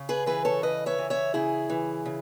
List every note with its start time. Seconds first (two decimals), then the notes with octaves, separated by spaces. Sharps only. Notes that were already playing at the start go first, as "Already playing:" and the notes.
Already playing: C#3
0.09 G#4 B4
0.26 E3 G#4 B4
0.45 A4 C#5
0.62 C#3 B4 D#5
0.86 C#5 E5
0.98 E3
1.10 C#5 E5
1.34 C#3 E4 G#4
1.70 E3
2.05 C#3